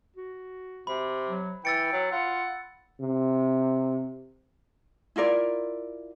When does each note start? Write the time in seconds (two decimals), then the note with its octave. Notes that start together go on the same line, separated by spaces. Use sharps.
0.17 F#4
0.87 C3 B5
1.29 F#3
1.65 E3 G5 E6 A6 C#7
1.93 F#3
2.12 F4 F#5
3.01 C3
5.16 E4 F4 A#4 D5